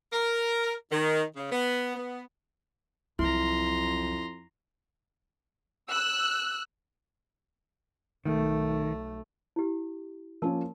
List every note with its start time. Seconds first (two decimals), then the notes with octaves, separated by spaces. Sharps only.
0.13 A#4
0.92 D#3
1.37 C#3
1.52 B3
1.96 B3
3.19 C2 F2 F#3 E4 A#5 C6
5.88 E6 F#6
8.25 B1 D#3 A3
9.56 E4 G4
10.42 F3 A#3 C#4 A#4 A5